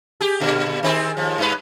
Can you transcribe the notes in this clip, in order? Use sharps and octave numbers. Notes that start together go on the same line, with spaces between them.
G4 G#4
A#2 D3
D#3 C4 G#4
D#2 F3
G2 E4 B4